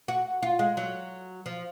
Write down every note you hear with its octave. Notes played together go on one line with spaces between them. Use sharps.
F#4
F4
G#3
F#3
F3